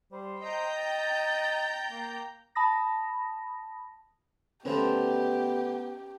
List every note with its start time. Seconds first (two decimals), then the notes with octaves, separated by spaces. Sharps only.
0.12 G3 C5
0.42 D#5 G5 A#5 G6
0.76 A6
1.91 A#3
2.55 A5 B5 D#6 A#6
4.65 D3 F3 A3 B3 C#4 G4 B4 C5